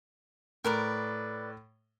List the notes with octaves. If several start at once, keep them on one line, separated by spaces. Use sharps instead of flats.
A2 A#4 B4 D5